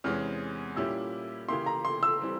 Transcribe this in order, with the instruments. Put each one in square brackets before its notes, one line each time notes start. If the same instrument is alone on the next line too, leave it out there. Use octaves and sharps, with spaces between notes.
[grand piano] E2 C3 E3 G#3 C#4 [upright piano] F6
[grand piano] A#2 G3 C#4 E4 G4 [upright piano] E6
[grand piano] C#3 E3 A#3 E4 G4 [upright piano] C6
[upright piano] A#5
C6
E6
[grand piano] E3 G3 C4